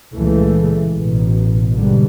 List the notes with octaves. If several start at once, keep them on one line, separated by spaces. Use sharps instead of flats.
C#2 A#2 C#3 E3 G#3 A3
A1 B2
G#2 B2 D3 G3